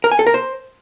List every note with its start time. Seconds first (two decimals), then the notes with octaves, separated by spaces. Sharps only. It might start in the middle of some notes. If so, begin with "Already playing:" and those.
0.04 A#4
0.12 G#5
0.19 A4
0.27 A#4
0.34 C5